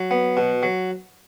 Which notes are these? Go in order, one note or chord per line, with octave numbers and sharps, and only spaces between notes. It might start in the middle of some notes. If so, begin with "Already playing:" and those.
Already playing: F#3
B3
B2
F#3